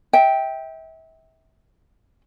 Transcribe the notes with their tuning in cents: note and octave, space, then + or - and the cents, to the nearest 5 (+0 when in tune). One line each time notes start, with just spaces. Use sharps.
E5 -30 G5 +0